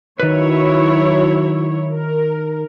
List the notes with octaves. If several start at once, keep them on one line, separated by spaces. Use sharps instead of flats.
D#3 F#3 E4 B4 C#5
A#4